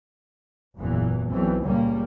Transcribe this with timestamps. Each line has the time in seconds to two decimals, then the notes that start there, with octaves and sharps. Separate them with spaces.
0.77 F#1 E2 A#2 E3
1.29 B1 E3 C4
1.64 C#2 A#2 G3 A#3